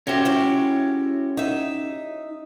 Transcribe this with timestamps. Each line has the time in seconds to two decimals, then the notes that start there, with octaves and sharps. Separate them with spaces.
0.07 C3 C#4 F#4 G4 E5
0.25 G#3 E4 C#5
1.37 D#4 E5